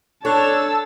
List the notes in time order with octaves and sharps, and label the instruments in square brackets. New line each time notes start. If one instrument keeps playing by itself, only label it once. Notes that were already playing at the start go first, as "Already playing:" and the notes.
[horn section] D4 C#5 [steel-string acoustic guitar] A4 [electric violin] A5 E6